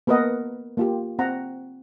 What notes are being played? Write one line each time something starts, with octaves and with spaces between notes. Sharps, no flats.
A#3 B3 A#4 B4 D#5 F#5
A#3 F4 G4
C4 F#5 A#5